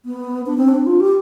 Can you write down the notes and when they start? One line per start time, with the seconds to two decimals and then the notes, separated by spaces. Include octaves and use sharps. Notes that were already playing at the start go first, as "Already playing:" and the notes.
0.05 B3
0.46 D4
0.57 C4
0.69 D4
0.86 F4
1.00 G4